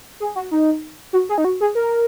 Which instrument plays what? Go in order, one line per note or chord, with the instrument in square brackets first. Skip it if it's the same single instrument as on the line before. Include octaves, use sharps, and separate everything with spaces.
[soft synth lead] G#4
F#4
D#4
F#4
G#4
D#4
F#4
G#4
A#4